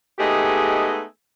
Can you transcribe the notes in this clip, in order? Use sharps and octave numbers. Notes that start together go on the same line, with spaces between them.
G#3 A3 B3 D#4 G4 G#4